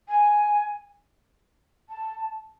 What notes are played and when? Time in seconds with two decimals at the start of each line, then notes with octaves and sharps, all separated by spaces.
0.08 G#5
1.89 A5